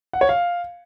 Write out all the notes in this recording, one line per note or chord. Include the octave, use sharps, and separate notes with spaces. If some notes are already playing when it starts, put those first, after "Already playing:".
F#5
C#5
F5